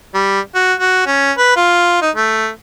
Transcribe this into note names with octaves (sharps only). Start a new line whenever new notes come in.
G3
F#4
F#4
C#4
B4
F4
D#4
A3